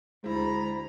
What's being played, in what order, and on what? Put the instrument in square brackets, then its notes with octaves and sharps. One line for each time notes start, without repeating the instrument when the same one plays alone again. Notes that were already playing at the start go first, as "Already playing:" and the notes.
[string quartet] D2 A#5 B5 [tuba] G#3 [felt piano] E4 C5